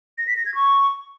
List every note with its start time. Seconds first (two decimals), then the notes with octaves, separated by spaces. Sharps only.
0.18 A#6
0.27 B6
0.36 A#6
0.46 G#6
0.55 C#6